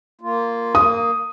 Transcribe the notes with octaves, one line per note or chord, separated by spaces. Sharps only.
A#3 F4
A#3 D#6